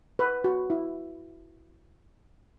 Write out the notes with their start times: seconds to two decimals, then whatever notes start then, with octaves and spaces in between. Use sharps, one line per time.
0.19 B4
0.44 F#4
0.70 E4